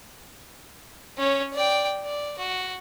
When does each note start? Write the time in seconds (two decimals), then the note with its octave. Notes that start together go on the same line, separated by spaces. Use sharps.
1.18 C#4 C#5
1.53 D5 G5
2.05 D5
2.38 F#4